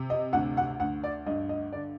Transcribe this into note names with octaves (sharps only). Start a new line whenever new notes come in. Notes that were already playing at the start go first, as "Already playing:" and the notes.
Already playing: C3
D#5
D2 F#5
F#5
D2 F#5
D5
G2 D#5
D#5
D3 D5